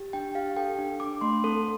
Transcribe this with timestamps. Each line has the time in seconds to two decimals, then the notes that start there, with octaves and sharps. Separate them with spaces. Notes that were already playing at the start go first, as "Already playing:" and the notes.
Already playing: G4
0.13 D4 G5
0.35 G4 F5
0.57 A4 G5
0.79 D4
1.00 D4 D6
1.21 A3 C6
1.44 C4 A4